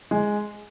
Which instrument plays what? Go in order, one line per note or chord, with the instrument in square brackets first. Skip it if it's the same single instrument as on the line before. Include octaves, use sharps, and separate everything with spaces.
[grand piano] G#3